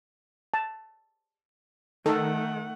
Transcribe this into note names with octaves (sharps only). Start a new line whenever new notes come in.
A5
D#3 A3 A4 F#5